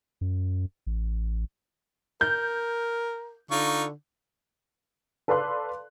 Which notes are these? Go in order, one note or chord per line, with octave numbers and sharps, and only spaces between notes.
F#2
A1
A#4 G6
D3 D#4 F4 C#6
A4 B4 D5 F5 C6 F#6